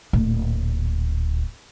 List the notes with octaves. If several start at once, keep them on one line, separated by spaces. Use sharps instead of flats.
D1 A#2